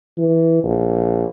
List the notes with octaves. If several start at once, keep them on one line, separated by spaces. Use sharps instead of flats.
E3
A#1